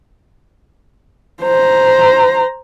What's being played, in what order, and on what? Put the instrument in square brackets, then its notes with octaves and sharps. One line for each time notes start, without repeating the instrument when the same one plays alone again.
[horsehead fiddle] C5 A#5